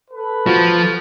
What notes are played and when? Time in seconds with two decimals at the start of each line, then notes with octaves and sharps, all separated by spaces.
0.11 A4 B4
0.46 F3 F#4